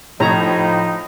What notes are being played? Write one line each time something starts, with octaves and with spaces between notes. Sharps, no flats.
A2 F3 D#4 C#5 A#5